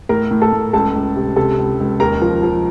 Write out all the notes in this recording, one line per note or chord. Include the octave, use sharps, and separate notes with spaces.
A2 A#4 A#5
A2
A4 A5
A2
C#2 A4 A5
C#2
C3
C3 A4 A5
C#2
C#2
D#2 A#4 A#5
F3
F3